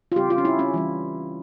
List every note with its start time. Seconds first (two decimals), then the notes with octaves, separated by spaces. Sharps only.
0.12 F4
0.16 C#3 G3 C4 G4
0.30 F4
0.38 C#4
0.45 E4
0.59 C#4
0.74 E3 G3 C#4